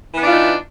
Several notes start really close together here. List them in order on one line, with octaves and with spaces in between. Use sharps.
E3 B3 D4 F4 D#4